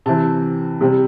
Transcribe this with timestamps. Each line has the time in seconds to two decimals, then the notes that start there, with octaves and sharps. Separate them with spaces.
0.06 C3 E3 C4 A5
0.81 C3 G3 C4